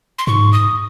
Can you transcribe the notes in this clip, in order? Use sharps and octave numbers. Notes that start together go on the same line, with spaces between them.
C6
G#2 C#6
D#6